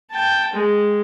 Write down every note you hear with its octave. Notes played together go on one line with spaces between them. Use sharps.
G5 A5
G#3